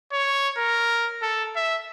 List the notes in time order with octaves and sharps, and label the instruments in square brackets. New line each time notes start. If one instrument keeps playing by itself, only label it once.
[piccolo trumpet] C#5
A#4
A4
E5